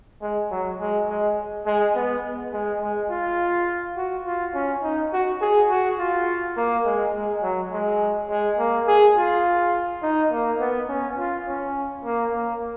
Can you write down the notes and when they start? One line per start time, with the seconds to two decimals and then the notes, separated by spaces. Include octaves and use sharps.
0.22 G#3
0.51 F#3
0.79 G#3
1.09 G#3
1.66 G#3
1.95 B3
2.53 G#3
2.81 G#3
3.10 F4
3.97 F#4
4.26 F4
4.54 C#4
4.83 D#4
5.13 F#4
5.42 G#4
5.70 F#4
5.99 F4
6.57 A#3
6.85 G#3
7.14 G#3
7.43 F#3
7.72 G#3
8.30 G#3
8.59 A#3
8.88 G#4
9.17 F4
10.02 D#4
10.32 A#3
10.60 B3
10.89 C#4
11.19 F4
11.47 C#4
12.05 A#3
12.33 A#3